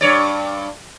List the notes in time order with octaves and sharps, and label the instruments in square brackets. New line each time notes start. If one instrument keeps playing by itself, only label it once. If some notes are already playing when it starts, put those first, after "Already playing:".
[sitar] G2 C#5 D5